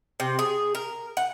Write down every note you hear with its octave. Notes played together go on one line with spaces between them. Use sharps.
C3
G#4
A#4
F#5